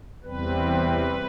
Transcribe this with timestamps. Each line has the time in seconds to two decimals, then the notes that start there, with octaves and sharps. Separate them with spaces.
0.24 E2 C3 G3 C4 B4